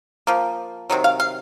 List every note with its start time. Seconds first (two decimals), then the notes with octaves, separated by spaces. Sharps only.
0.27 F3 A#3
0.90 C3 D#3 F#3
1.04 F5
1.20 F5